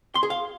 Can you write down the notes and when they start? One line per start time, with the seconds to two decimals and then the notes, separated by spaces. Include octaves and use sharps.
0.15 C6
0.23 G#4
0.30 F5